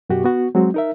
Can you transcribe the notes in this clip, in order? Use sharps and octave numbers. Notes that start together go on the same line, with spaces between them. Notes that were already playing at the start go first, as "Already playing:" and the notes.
F#2 B2 F#4 G4
B3 F#4
F#3 G#3 C4 F#4
D#4 A#4 E5